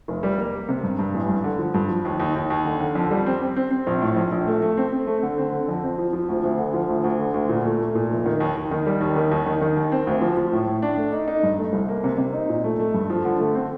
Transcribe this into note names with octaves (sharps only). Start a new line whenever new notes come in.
F1
G3
A#3
A#3
C3
G2
G2
A1
G2
D3
F3
G2
F3
D#2
D#2
D#2
D#2
D3
D3
F2
G3
C4
C4
C4
C4
A#1
A2
A#1
A#1
A3
A3
C4
C4
A3
D3
C4
D3
F2
C4
F3
F3
D2
D2
D3
F3
D2
D2
D3
D2
A#2
A3
A3
A#2
F1
D#3
D#2
D#2
D#3
G3
D#2
D#3
D#2
D#3
D#3
D#2
C4
D2
F3
F3
A2
A2
D4
A3
D#4
D#4
G2
A3
C2
A#3
C3
C3
D#4
A#2
A3
A3
G2
F3
D3
A3
C4